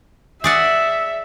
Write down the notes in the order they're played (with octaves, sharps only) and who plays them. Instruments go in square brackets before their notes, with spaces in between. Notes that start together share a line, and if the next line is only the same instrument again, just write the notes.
[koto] G#4 D5 F#5 [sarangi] E5